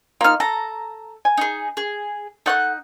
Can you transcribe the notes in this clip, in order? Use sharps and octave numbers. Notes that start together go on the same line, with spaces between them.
A#3 D#4 F4 F6
A4 A#5
G#5
D#4 G#4
G#4
D#4 A4 F#5 C#6 F#6